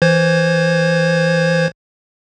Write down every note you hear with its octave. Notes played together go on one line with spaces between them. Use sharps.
E3 C5 G#6